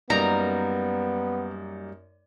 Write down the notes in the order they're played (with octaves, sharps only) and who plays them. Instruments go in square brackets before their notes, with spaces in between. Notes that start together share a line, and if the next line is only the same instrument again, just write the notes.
[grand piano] F#2 A#3 D#4 [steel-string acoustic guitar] G3 [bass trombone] B3 [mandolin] A#5